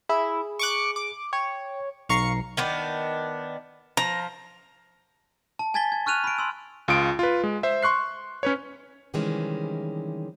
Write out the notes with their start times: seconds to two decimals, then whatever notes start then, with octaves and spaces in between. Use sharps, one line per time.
0.09 E4 G#4
0.59 C#6 D6 F#6
0.96 D6
1.33 C#5 G5
2.09 B1 F5 A#5 C#6 C7 C#7
2.57 D#3 B3 D4
3.97 F3 A#5
5.59 A5
5.74 G#5 A5 G#6 A6 B6 G7
5.92 G#6
6.06 C#6 F6 F#6 D#7 F7
6.24 B5 D7
6.38 C6 E6
6.88 C#2 F4 D#6 D7
7.19 F4 B4
7.44 G#3
7.63 C5 E5
7.83 C6 C#6 F#6 C7
8.43 C#4 B4 C#5
9.14 C3 D#3 E3 G3 G#3 C#4